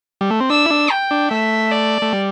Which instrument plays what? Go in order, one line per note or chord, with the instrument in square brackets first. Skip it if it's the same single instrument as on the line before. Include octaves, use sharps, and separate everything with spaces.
[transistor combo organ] G3
A3
C4
[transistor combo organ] D4 [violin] E6
[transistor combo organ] E4
D4
[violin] G5
[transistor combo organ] D4
[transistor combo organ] A3 [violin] E5
[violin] D5
[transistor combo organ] A3
G3